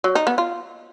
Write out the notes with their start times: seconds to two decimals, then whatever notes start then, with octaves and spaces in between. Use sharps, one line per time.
0.04 F#3
0.15 D#4
0.27 B3
0.38 F4